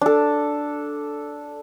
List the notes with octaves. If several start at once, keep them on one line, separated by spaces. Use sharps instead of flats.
D4 A4